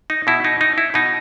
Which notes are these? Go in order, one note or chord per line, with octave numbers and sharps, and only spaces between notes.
D#4
B2 E4
D#4
D#4
E4
B2 D#4